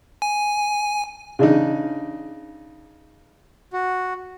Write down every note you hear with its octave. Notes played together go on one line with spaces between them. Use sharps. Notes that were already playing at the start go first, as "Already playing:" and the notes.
G#5
C#3 D4 D#4
F#4